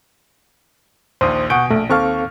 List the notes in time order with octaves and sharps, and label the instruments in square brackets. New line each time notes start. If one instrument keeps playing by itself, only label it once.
[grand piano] A#1 D#2 [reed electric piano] C5 D#6
[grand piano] B2 G#5 D7 [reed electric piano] F#5 C#6 G6
[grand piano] A#1 [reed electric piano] A3
[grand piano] D#2 C#6 F6 [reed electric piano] C4 A4 F5